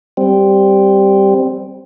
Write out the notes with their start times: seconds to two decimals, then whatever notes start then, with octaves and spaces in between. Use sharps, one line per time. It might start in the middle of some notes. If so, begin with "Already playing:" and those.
0.17 G3 C4